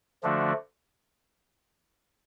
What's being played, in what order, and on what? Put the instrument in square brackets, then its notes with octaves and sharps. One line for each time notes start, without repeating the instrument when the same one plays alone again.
[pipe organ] D3 F3 A3 D4 F#4